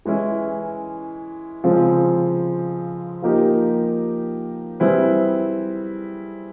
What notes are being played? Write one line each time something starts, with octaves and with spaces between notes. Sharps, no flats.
E3 G#3 C#4 E4
C#3 F3 G#3 C4
F3 A#3 D#4 G4 A#4
G3 C4 E4 G#4 B4